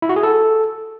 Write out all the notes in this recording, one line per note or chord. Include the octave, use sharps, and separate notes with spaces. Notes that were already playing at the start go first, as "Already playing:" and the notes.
E4
F#4
G#4
A4